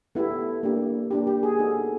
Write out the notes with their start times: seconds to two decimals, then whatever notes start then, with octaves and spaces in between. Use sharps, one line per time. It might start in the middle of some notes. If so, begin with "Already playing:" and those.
0.15 B3 E4 G4 A4
0.63 A#3 D4 G4
1.11 A#3 D4 G4
1.27 G4
1.43 G#4
1.59 B3 D#4 F#4 A4